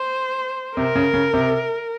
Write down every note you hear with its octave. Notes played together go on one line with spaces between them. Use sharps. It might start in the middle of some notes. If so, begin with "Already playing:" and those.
Already playing: C5
C3 A#4
C#3
C#3
C3